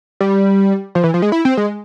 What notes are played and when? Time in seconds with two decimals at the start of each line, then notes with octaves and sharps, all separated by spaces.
0.21 G3
0.95 F3
1.04 E3
1.14 F3
1.22 G#3
1.32 E4
1.45 C4
1.57 G#3